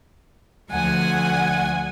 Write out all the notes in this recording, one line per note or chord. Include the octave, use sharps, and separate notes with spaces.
D2 F3 F#5 G#5 G#6